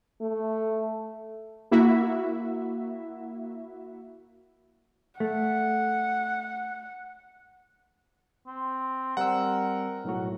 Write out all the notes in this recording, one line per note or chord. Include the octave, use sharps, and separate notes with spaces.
A3
A#3 E4 F#4 E5
A3 F#5
C4
G3 C4 A#4 F#5 E6
B1 A2 F#4